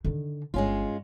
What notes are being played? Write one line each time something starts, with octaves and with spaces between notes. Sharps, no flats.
D3 D#3
G1 G#3 C#4 F4